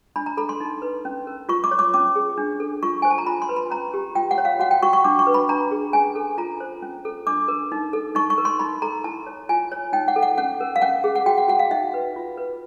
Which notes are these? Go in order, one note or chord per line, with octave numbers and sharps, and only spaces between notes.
D4 B5
A#5
A4 B5
C6
D#4
B4
C#4
A#4
F4 C#6
D6
C#5
D6
C#4 D6
G#4
D4
A4
F4 C#6
C5 G#5
A5
A#5
F4 B5
C6
B4
B5
C#4 A#5
G4
F4 G5
F#5
C#5
F5
F#4 F#5
G5
F#4 C#6
C#6
D4 D6
C#6
B4
B5
D4 A#5
G#4
C#4 G#5
A4
F4 A#5
C5
C#4
A4
D4 D6
A#4
D#4
A4
D#4 C#6
C#6
A#4
C6
D#4 B5
A4 A#5
E4 A5
C#5
F4 G#5
C#5
D#4 G5
F#5
A4
F#5
C#4 F#5
A#4
F5
C#4 F#5
G#4
F#5
F#4 G5
F#5
F#4 F#5
F5
D#4 E5
B4
F4
B4